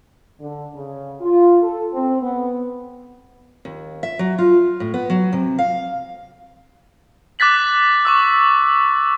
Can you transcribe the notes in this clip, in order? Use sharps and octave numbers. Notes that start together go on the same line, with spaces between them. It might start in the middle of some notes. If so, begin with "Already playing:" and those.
D3
C#3
F4
A4
C4
B3
D#2
E5
F#3
F4
A2
B3
F#3
C3
F5
D6 F#6 A6 B6 F#7
C#6 D6 E6